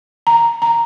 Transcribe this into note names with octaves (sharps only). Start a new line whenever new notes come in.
A#5
A#5